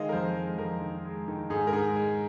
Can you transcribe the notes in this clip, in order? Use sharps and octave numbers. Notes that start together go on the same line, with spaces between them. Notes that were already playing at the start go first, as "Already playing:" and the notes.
Already playing: D#3 G#3 D#5 F5
A#4
F2 C5
G#3
F2 A#4
D#3
G#3
D#3
G#2 G#4
A#4
G#2 G#4
G#3